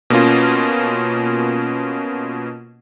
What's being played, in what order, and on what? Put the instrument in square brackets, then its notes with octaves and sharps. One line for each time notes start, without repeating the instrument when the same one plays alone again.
[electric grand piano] B2 A#3 C#4 F4